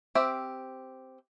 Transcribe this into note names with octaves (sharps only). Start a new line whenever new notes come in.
C4 G4 E5 F5